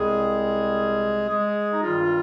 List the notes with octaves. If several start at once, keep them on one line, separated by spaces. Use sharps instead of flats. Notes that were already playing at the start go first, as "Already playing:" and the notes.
Already playing: C2 C3 G3 G#3 C4 G#4
G#3 G#4
D#4
G2 D#3 G3 F4